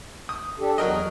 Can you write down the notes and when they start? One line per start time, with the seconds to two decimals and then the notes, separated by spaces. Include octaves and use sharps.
0.29 D#6
0.59 D4 G4 A4
0.78 E2 F#3 A#4 D#5